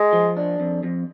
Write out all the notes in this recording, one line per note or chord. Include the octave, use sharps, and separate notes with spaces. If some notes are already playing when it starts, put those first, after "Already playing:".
Already playing: G#3
F3
D4
F2
F2